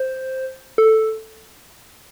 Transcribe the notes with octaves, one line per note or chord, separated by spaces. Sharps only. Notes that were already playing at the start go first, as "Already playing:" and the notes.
Already playing: C5
A4